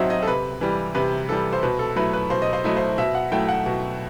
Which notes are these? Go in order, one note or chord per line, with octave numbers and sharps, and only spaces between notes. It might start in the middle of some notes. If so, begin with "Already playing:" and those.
Already playing: A2 F#3 C4 D#4 E5 F#5
D#5
A4
C3 B4
E3 G3
C3 B4
E3 G3 A4
C5
B2 B4
A4
F#3 A3 E4 B4
B4
B2 C5
D#5
C5
F#3 A3 E4 D#5
C5
B2 E5
F#5
F#3 A3 E4 G5
F#5
B2